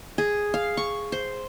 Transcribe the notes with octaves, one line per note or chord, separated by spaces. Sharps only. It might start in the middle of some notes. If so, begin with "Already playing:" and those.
G#4
F5
C#6
C5